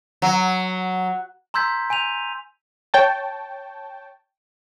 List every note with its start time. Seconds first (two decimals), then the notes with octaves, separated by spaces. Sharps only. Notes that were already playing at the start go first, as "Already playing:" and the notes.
0.22 F#3
1.54 A#5 C6 E6 G6 G#6 B6
1.90 G#5 G6 D#7 F7
2.94 C#5 G5 A5